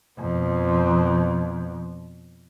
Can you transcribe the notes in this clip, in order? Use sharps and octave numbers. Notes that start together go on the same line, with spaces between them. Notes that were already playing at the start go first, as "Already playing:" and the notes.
F2 B2